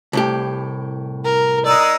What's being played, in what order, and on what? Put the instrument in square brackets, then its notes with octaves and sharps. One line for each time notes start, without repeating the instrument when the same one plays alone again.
[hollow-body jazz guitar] C2 A2 G4
[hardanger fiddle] A#4
[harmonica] G#3 D#4 E6 [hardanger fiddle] D5